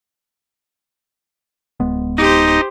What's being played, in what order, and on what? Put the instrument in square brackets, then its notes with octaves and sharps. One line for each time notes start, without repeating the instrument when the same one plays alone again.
[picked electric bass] D1 G#3 B3
[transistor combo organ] D#4 [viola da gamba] G4 C5